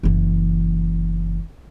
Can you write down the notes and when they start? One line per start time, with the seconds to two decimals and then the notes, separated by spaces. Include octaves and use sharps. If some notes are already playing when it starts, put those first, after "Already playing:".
0.03 F#1 E3